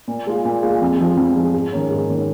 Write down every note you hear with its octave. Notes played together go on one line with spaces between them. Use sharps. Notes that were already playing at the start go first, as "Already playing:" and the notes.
A#2
G#3 F4
A#2
G#3 F4
F2
F3 G#3
F2
F3 G#3
G#2
D#3 A#3 C#4
G#2
D#3 A#3 C#4